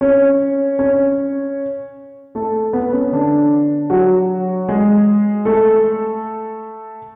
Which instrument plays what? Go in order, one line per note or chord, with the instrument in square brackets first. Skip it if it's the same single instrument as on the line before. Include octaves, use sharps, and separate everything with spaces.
[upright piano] C#4 C#5
C#4 C#5
A3 A4
B3
C#4
D3 D4
F#3 F#4
G#3 G#4
A3 A4